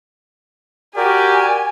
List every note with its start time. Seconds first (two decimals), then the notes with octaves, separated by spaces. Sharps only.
0.96 F#4 G4 A#4 D5 G#5